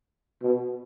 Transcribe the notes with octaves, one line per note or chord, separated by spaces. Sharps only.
B2